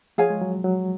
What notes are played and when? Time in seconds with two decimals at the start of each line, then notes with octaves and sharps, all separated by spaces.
0.18 F3 G#4 C#5 F5 G#5
0.30 G#3
0.42 F#3
0.64 F#3